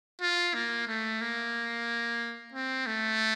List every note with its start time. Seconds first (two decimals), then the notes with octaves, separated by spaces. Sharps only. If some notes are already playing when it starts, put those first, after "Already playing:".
0.21 F4
0.54 A#3
0.88 A3
1.21 A#3
2.54 C4
2.87 A3